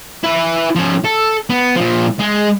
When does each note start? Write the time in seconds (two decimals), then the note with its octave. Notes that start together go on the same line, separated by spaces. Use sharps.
0.23 E4 B4
0.76 F3 C#4
1.05 A4
1.50 B3
1.76 A#2 F3
2.20 G#3